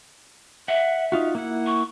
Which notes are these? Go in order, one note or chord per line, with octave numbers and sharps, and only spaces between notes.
E5 F#5
D#4 F4 F#4
A#3 E4 F#5
C#6